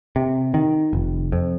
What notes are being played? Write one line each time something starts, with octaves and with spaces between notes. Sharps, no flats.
C3
D#3
F1
F2